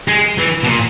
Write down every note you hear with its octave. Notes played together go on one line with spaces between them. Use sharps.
G#3
E3
B2
A#2